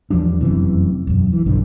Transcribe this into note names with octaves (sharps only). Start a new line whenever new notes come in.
E2 F3 G3 D4
F1 F#2 C3 E3
E1 F#2
E3
B1 G2 D3